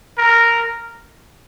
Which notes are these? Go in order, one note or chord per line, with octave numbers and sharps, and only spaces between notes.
A#4